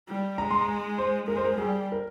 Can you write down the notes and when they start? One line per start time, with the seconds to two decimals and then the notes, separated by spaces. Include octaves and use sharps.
0.09 G3
0.38 G#3 A#5
0.51 C6
0.61 A#5
0.98 C5
1.28 G#3 A#4
1.37 C5
1.45 A#4
1.58 G3 G#4
1.92 A#4